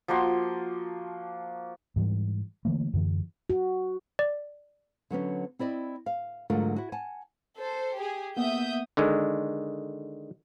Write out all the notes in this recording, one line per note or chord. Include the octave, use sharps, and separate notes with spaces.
F3 A#3 F#4 C6
G#2 E3 F3 G3
D3 E3 A3 A#3
F#2 D3 E3
F#4
D5
D3 F#3 B3 C#4
C4 E4 D5 D#5
F5
G#2 D3 F#3 A3 F4 A#4
E4 F#4
F#5 G#5 A5
A4 C5
G4 G#4
A#3 B3 E5 F#5 D#6 G6
D3 D#3 G#3